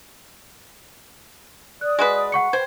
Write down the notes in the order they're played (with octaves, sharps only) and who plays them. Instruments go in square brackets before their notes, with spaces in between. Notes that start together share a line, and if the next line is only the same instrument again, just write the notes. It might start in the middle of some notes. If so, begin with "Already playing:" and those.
[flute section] D5 D#6 [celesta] F#6
[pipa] G#3 F#4 B4
[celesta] F#5 C#6 C#7
[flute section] B4 G5 [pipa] C5 [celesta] G#6